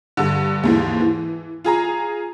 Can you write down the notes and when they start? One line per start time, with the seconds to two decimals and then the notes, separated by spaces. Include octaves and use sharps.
0.17 G2 D3
0.63 D#2 G#2 E3
1.01 E3
1.64 F4 G#4 A#5